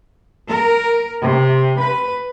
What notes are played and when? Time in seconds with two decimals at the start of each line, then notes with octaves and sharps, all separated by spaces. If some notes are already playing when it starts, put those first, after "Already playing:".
0.49 A#4
1.22 C3
1.79 B4